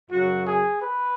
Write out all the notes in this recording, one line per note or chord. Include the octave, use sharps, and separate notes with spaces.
F#2 C#3 F#3 F#4
G#4
B4